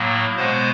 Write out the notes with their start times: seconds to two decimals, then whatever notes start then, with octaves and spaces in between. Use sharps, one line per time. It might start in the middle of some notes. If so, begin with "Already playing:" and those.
Already playing: A2 F#3 A#3
0.36 B2 G#3 B3 C5